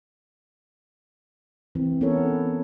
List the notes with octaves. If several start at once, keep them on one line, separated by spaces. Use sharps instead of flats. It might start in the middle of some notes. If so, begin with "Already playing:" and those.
E3 C4
B3 C#4 E4 A4 A#4 C#5